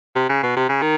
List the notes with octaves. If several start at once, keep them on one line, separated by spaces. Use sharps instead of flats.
C3
C#3
B2
C3
C#3
D#3